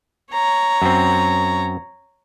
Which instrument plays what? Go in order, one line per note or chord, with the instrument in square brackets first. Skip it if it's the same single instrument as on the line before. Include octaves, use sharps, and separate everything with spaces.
[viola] C#5 A#5
[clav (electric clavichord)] F#2 C4